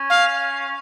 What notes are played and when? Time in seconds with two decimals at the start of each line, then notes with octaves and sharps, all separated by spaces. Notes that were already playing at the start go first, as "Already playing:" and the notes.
Already playing: C#4
0.10 F5